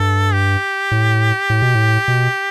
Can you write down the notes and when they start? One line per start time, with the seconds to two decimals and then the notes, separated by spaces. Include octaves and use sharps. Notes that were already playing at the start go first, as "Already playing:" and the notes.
Already playing: G2 A4
0.33 G4
0.91 A2
1.50 A2
1.62 B2
1.75 A2
2.08 B2